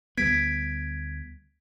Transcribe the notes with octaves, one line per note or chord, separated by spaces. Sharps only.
D2 G3 B3 G#6 B6 D7